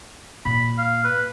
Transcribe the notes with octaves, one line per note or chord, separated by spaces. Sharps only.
A#2 B5
F5
B4